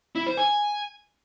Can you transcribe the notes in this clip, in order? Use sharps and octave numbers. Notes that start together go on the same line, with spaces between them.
E4
C5
G#5